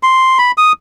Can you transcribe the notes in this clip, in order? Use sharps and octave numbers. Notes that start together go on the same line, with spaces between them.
C6
B5
D#6